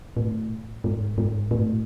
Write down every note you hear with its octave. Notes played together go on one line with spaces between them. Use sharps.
A2
G#2
G#2
A2